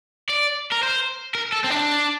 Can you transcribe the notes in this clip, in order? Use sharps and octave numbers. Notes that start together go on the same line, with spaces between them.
D5
A#4
C5
A#4
A4
C4
D4